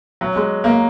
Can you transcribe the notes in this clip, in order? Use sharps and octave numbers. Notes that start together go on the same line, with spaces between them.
F#3
G#3
A#3